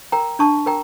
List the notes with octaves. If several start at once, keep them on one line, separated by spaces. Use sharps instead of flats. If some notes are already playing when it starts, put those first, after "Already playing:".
A#4 G5 A#5
D4 A5 C#6
A#4 G5 A#5